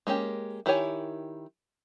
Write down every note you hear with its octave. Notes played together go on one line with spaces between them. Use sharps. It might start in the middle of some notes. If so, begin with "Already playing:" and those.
G#3 A#3 C#4 G4
D#3 E4 G4 C#5 G#5